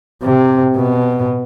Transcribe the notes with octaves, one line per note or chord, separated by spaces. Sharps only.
C3
B2